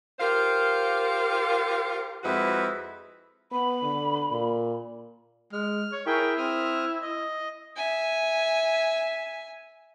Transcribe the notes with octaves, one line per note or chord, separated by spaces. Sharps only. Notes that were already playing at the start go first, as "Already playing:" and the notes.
F4 G4 A#4 C5 F5
F2 G#3 E4 F#4 B4
B3 B5
D3
A#2
G#3 F6
C#5
E4 G#4 A#4 G5
C4 D#6 F6
D#5
E5 G#5